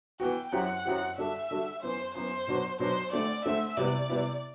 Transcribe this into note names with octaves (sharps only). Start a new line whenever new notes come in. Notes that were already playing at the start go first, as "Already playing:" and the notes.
E3 B3 F#4 G5
F#2 F#3 C4 E4 G4 F#5
F#2 F#3 C4 E4 G4
D3 G3 D4 F#4 A4 E5
D3 G3 D4 F#4 A4
F#2 E3 B3 C5
F#2 E3 B3 C5
B2 F#3 B3 D4 F#4
B2 F#3 B3 D4 F#4 C5
D3 A3 C4 D5
D3 A3 C4 E5
C3 G3 B3 E4 D5
C3 G3 B3 E4